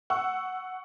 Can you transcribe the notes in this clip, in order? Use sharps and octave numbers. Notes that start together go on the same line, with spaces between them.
F#5 C#6 E6